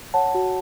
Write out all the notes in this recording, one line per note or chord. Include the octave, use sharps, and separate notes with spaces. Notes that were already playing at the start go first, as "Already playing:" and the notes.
C#5 F#5 A5
F#4